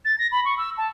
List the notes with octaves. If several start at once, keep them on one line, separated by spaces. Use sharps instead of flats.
A6
A#6
B5
C#6
E6
A5